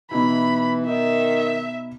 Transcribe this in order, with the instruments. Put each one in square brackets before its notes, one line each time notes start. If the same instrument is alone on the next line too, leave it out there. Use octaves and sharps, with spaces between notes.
[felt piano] B2 D#4 E4 [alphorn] E3 [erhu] B5
[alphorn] D#3 [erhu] E5